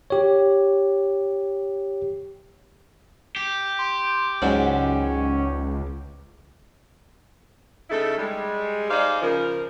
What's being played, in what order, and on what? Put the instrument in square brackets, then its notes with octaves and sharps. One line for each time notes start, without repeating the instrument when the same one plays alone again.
[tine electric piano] G4 C#5
[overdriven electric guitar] G4
[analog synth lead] C6
[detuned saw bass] C#2 [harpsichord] G#2 F#3 D4 [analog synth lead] C#4
[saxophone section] C#3 A3 D#4 E4 A4
G3 G#3
D#4 G#4 C5 D5 D#5 F5
C#3 F3 A#4